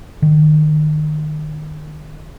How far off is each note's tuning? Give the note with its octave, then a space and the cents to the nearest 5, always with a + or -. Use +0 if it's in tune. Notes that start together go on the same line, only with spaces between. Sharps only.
D#3 -30